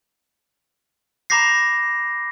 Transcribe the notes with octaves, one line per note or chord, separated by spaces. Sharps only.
A#5 B5 D6 G6 A#6 C7